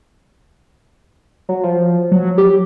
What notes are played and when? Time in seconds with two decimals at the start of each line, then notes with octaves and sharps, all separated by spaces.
1.49 F#3
1.63 F3
2.11 F#3
2.38 G4